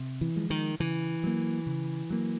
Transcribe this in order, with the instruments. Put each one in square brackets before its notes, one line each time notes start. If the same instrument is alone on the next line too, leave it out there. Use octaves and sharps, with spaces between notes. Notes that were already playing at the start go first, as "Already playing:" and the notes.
Already playing: [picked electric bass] C3
[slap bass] E3
[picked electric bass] F3 G#3
[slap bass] D#3
[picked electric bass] C#3 [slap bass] E3
[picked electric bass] F#3 A#3
C#3
F#3 A#3